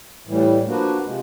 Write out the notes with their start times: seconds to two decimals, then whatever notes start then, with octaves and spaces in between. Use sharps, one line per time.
0.27 A2 E3 G3
0.67 F3 A#3 D4 F#4 B4
1.05 C3 F3 G#3